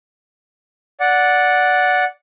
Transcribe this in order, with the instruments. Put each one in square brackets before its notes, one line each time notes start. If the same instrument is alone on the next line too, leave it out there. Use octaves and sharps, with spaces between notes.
[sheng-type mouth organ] D5 F#5